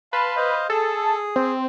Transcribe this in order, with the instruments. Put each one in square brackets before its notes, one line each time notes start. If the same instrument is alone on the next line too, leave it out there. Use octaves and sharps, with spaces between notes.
[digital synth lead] B4 [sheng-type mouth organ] F5 A5 C6
[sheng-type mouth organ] C5 D#5 F5
[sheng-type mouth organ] G#4 [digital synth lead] A4
[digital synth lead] C4